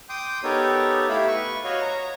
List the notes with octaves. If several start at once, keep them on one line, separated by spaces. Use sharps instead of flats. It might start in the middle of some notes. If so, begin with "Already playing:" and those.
G5 C6 D6 D#6 G6
B3 D#4 G4 A4 A#4 C#5
A3 E4 G4 E5 F5 B5
B4 C#6
F#4 C#5 D#5 F5
C#5 A#5